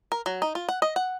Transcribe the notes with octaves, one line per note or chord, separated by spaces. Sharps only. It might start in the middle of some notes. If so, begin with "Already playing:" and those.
A#4
F#3
D#4
F4
F#5
D#5
F#5